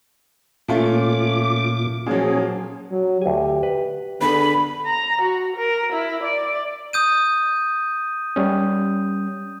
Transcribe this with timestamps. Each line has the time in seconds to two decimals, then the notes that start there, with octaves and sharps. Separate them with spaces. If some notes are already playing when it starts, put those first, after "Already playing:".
0.68 A#2 A3 C#4 F4 D6
2.06 A#2 F3 F#3 C#4 G#4
2.91 F#3
3.22 D2 G4 G#5
3.63 B4
4.21 D3 B3 D4 G#4 B5
4.86 A#5
5.22 F#4
5.57 A#4
5.93 E4
6.23 D5
6.93 D#6 G6 D#7
8.36 G3 C#4